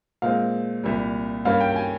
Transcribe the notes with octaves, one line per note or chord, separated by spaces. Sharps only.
A#2 G#3 C4 F5
C2 A#2 G3
G2 G3 A#3 C#4 F5
G5
G5
G#5